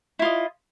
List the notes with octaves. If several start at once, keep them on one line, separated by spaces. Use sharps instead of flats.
E4 F4 D#5